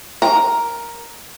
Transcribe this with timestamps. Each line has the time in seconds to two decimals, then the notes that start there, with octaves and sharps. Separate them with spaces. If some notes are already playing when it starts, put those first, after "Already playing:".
0.22 A#4